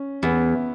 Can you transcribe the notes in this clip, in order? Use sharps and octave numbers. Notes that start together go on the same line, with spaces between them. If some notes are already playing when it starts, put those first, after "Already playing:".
Already playing: C#4
E2 B3